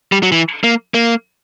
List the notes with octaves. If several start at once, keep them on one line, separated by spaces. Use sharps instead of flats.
G3
F#3
E3
A#3
A#3